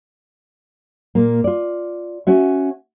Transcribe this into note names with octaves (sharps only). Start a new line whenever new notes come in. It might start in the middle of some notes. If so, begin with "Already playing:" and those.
A#2 A#3
F4 D5
C#4 F#4 E5